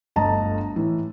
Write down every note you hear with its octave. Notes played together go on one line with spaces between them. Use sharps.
G1 D2 D#5 A5 A#5
A2 E3